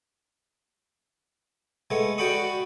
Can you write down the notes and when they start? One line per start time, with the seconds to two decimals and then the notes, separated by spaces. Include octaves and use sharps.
1.90 G#3 A3 B3
2.18 F#4 D5 G5 B5 C#6 D#6